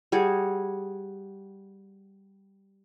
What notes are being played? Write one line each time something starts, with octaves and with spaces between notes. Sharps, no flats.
G3 F#4 G#4